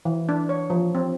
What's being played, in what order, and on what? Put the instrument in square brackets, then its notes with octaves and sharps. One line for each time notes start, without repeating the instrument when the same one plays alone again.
[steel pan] E3
D4
C#5
F3
C4